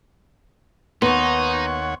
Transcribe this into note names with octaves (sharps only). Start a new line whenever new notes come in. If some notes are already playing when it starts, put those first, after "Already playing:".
D#2 B3 D#4 C#5 F#5 C6 C#6